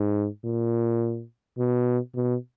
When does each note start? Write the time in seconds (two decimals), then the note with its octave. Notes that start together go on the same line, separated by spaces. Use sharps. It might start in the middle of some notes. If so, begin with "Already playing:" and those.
Already playing: G#2
0.44 A#2
1.58 B2
2.15 B2